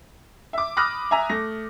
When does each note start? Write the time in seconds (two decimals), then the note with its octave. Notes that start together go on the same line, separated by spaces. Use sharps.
0.53 E5 D6
0.77 B5 D6 D#6 F6 F#6 A#6
1.11 E5 G#5 A#5
1.29 A3 A#6